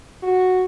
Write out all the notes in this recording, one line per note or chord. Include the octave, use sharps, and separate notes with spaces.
F#4